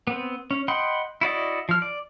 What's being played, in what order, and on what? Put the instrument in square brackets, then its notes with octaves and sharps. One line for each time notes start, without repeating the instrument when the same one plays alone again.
[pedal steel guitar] B3 C4
C#4
D#5 F#5 G5 B5 C6
E4 F#4 D5 D#5
F3 F6
D5